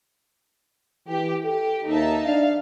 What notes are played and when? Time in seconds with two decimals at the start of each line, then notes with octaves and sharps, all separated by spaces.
1.08 E3 G4
1.45 G4 A4
1.88 D#2 D#4 E5 A5
2.26 D4 F5